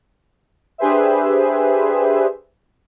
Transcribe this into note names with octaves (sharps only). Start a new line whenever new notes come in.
D4 G4 G#4 B4 C5 E5